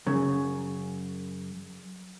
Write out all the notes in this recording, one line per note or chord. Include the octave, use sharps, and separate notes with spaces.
F#2 C#3